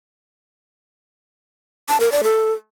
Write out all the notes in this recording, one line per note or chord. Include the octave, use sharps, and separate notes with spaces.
A5
A#4
D5
A4